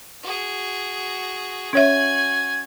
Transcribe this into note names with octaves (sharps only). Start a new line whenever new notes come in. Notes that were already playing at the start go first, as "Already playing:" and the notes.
F#4 G#4
C#4 F#4 C#5 E5 G#5 G#6